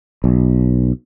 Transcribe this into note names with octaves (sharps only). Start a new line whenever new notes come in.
B1